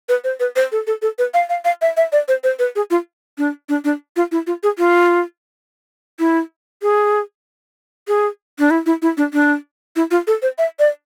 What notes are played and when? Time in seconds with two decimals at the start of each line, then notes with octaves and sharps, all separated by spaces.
0.09 B4
0.24 C5
0.40 B4
0.56 C5
0.72 A4
0.87 A4
1.02 A4
1.19 B4
1.34 F5
1.49 F5
1.65 F5
1.82 E5
1.97 E5
2.12 D5
2.28 C5
2.44 C5
2.59 B4
2.76 G#4
2.91 F4
3.38 D4
3.69 D4
3.84 D4
4.16 F4
4.32 E4
4.47 F4
4.63 G#4
4.78 F4
6.19 E4
6.82 G#4
8.08 G#4
8.59 D4
8.71 E4
8.86 E4
9.02 E4
9.17 D4
9.33 D4
9.96 E4
10.11 F4
10.27 A4
10.42 C5
10.58 E5
10.79 D5